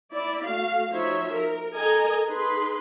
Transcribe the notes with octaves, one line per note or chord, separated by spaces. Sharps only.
E4 D5
A3 F#4 F5
F3 D#4 F#4 C#5 E5
A#4
A4 A#4 D#5 G#5 A#5
D#4 G#4 B4 C6